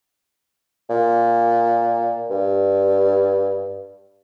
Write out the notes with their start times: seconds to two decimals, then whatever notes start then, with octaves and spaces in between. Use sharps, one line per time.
0.89 A#2
2.30 G2